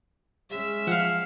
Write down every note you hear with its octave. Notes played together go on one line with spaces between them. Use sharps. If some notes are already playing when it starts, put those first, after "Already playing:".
G#3 C#4 E5
F3 F5 F#5